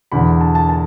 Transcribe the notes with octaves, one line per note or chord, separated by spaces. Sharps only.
E1 E2 D3 B5
A5
A5
A5